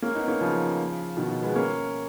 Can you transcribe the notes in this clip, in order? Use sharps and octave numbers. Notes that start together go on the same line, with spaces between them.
A#3 C#4
B3 D#4
A#3 C#4
C#3 F3
B2 D#3
G#3 B3
A#3 C#4